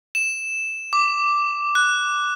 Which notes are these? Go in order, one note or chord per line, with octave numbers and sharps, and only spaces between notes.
E7
D6
F#6